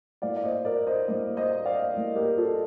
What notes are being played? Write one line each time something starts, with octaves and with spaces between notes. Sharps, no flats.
A2 G3 A#3 D5 F5
D5
C5 D#5
A#4 D5
C5 D#5
A2 G3 A#3 C5 D#5
C5 D#5
D5 F5
A2 G3 A#3
G4 A#4
F4 A4